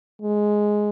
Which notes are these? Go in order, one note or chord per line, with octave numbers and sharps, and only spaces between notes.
G#3